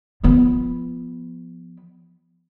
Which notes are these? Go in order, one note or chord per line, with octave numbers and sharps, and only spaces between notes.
F3 B3